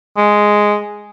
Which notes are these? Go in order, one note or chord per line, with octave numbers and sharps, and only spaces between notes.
G#3